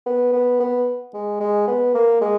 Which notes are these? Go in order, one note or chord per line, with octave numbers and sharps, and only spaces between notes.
B3
B3
B3
G#3
G#3
B3
A#3
G#3